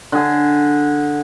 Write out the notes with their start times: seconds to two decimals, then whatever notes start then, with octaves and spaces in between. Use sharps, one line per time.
0.12 D3 G#4